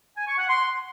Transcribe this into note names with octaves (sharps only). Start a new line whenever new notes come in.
G#5
C#6
F#5
C6